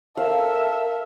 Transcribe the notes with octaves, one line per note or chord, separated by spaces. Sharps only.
A4 A#4 E5 F5 A5